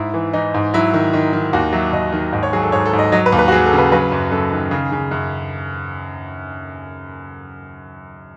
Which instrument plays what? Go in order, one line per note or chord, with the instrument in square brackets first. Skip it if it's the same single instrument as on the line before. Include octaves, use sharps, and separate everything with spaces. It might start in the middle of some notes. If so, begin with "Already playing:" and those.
Already playing: [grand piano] G#2 E4
E3
E3 D#4
G#2
F#3 E4
D#3
D#3
D#3
D#2 F#4
F#3 E5
D#2 D#5
D#3
G#2 D#5
C#5
F#3 G#4
A4
G#2 C#5
A4
G#2
D#5
F#3 D#5
B4
D#2
B4
F#4
F#3 G#4
A4
C#3
B4
F#3 B4
F#2
F#2 A4
D#3
C#3 G#4
C#3
F#2